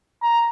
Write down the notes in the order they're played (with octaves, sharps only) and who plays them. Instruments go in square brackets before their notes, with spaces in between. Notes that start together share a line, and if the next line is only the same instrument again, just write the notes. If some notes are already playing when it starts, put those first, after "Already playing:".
[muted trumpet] A#5